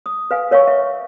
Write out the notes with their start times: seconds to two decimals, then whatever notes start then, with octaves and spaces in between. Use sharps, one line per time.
0.06 D#6
0.31 B4 F5 G#5
0.51 A#4 C#5 F5 G#5 C#6
0.67 E5